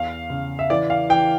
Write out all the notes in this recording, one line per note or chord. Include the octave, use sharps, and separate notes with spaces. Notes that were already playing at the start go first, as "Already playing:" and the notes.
Already playing: E2 F5
C#3
E5
E3 D5
F5
E3 G5